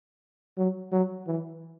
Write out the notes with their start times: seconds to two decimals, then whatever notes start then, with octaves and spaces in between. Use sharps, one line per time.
0.57 F#3
0.92 F#3
1.27 E3